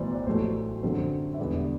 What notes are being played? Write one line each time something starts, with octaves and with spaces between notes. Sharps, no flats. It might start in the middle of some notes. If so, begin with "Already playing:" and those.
Already playing: B1 A2 E3 B3 C5 D5
D5
A1 A2 F#3 A3 C5
F#2 D3 F#3 C4 C5
E5
E1 E2 D3 G3 B3 D5